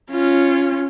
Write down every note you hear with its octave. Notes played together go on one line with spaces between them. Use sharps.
C#4 F4